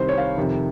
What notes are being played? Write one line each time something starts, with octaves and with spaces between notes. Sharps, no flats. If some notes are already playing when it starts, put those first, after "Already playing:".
Already playing: C2 C3 D#3 C5
C#5
F5
F2 C3 D#3